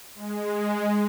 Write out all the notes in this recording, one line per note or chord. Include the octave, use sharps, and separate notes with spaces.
G#3